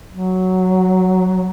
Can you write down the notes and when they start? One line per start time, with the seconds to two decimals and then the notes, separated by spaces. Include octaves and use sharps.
0.10 F#3